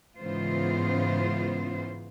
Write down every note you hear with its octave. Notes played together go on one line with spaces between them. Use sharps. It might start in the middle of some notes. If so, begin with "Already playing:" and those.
G#2 C#3 E3 B3 F4 C5